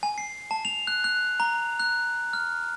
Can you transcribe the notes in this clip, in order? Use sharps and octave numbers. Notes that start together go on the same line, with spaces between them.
G#5
C7
A5
F7
F#6
F#6
A#5
F#6
F6